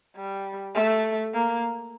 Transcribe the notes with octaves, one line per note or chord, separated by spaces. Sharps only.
G3
A3
A#3